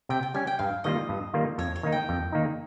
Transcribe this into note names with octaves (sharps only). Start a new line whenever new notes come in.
C3 G5
G5
G3 C#4 G#5
G5
G2 F5
D#3 G3 A#3 F4 D#5
G2
D#3 G3 A#3 F4
F2 C#5
C#5
D#3 A#3 D#4
G5
F2
D#3 A#3 D#4